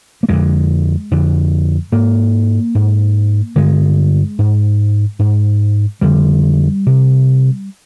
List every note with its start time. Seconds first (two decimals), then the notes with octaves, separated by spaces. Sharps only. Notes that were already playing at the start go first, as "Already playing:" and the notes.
0.23 A#3
0.29 F2 D3 G#3
1.11 F2 D3
1.92 G#2 A#3
2.75 G#2
3.56 G2 D3 G#3
4.39 G#2
5.19 G#2
6.01 F2 D3 G3
6.86 C3